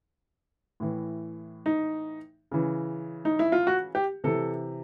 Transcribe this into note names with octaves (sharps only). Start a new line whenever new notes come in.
A2 E3
D#4
C#3 E3
D#4
E4
F4
F#4
G4
C3 E3 A4